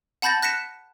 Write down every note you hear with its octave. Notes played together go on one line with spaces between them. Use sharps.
F#5 A5 B5 G6 A6 A#6
F#6 A#6 B6 C#7 E7